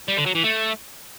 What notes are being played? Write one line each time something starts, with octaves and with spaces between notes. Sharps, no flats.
G3
D3
F#3
E3
A3